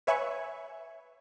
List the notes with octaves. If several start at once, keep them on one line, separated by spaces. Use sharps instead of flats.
B4 C#5 E5 G#5 B5 C#6